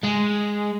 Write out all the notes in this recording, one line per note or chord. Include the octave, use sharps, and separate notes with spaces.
G#3